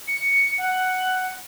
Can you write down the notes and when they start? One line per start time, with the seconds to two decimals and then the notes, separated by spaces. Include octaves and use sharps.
0.08 C#7
0.58 F#5